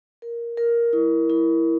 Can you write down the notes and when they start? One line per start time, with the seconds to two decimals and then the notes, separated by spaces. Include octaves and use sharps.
0.22 A#4
0.57 A#4
0.93 E4
1.30 E4